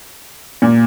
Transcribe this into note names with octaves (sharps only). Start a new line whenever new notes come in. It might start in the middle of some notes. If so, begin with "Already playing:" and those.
A#2